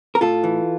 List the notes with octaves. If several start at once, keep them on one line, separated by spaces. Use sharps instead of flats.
A#4
A2 F4 A4
E3